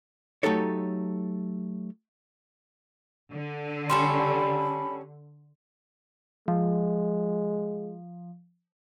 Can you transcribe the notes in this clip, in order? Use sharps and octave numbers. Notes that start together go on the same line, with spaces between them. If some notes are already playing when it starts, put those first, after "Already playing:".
F#3 A3 D#4 G4 A4 C#5
D3
G3 C#4 A4 B5 C6
F3 G#3